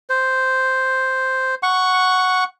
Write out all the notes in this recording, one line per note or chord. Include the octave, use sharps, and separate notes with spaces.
C5
F#5 C#6